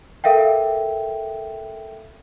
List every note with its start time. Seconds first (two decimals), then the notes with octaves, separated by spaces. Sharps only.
0.24 A4 A#4 E5 F5 G5